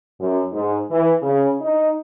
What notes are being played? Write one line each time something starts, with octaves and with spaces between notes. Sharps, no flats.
F#2
G#2
E3
C#3
D#4